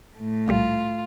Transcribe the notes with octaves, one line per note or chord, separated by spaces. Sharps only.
A2 A3
C2 A#2 G3 F4